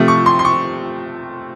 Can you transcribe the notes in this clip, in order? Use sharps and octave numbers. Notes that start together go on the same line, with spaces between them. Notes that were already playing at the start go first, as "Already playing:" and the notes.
Already playing: C3 F3 A3
C#6
C6
C6
C#6